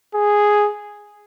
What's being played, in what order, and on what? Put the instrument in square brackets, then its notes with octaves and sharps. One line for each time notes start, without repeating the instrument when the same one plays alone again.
[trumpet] G#4